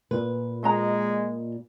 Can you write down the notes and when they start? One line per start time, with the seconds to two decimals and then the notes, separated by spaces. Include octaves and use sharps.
0.11 A#2 B4
0.64 G#3 D#5 A#5